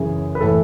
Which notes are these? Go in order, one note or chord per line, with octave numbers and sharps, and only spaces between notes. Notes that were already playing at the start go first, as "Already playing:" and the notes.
Already playing: F#2 C#3 E3 G#4
B4
A2 E3 A4